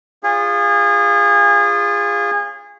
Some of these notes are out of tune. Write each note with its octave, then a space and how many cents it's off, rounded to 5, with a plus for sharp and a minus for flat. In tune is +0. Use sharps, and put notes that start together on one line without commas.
F4 +0 G#4 -25 C#5 -15